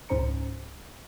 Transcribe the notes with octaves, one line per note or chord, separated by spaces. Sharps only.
C#2 G#2 C#4 C5 A#5 C#7